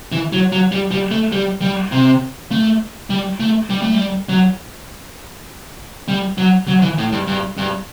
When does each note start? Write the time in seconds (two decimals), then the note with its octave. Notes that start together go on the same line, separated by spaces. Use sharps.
0.12 E3
0.32 F#3
0.52 F#3
0.72 G3
0.91 G3
1.11 A3
1.32 G3
1.61 G3
1.92 C3
2.51 A3
3.10 G3
3.40 A3
3.70 G3
3.82 A3
3.94 G3
4.29 F#3
6.08 G3
6.38 F#3
6.68 F#3
6.82 E3
6.98 A2
7.12 G2
7.27 G2
7.57 G2